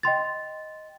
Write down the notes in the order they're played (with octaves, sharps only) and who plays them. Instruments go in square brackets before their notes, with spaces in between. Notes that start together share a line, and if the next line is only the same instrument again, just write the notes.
[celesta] D#5 G5 C6 A6